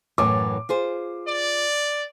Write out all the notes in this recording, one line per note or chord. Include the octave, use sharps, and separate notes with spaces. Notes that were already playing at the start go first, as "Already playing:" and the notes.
F#2 A2 E3 D6
F4 G#4 C5
D5